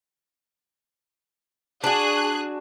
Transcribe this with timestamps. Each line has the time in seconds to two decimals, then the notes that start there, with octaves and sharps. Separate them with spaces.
1.84 D4 F#4 G#4 F#6